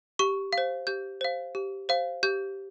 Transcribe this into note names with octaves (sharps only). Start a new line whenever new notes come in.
G4 C#6
F5
C5
G4 G6
C5 F5
G4
C5 F5
G4 G6